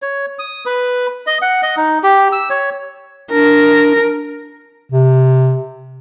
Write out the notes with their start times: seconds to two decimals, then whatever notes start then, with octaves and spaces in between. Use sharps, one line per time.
0.02 C#5
0.39 D#6
0.66 B4
1.27 D#5
1.42 F#5
1.63 D#5
1.77 D#4
2.03 G4
2.32 E6
2.50 C#5
3.32 D4 A#4
4.92 C3